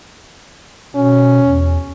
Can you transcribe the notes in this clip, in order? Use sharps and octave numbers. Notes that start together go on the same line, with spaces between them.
B2 C#4
E2